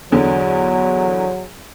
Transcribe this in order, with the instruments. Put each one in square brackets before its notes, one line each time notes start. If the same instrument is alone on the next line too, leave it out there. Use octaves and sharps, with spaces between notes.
[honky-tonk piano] E2 D3 [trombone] F#3